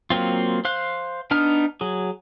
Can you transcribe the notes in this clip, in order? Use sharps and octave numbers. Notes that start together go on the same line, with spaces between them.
F#3 A#3 C4 F4
C5 F5 F#6
B3 D4 D#4 F6
F#3 G#4